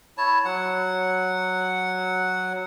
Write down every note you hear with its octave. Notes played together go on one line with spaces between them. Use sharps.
E4 C#5 A5
F#3 F#5